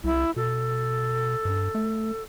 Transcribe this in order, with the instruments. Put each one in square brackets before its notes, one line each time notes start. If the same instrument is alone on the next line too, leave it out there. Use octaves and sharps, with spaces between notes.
[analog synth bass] C2 [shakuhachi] E4
[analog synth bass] B2 [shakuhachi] A4
[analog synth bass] G2
A3